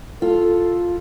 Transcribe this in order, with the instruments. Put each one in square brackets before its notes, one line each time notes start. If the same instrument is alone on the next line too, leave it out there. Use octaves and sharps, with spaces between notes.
[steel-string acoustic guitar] F4 [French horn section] A4